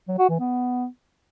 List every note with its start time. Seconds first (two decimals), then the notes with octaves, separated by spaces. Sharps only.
0.08 F#3
0.19 F#4
0.29 E3
0.40 B3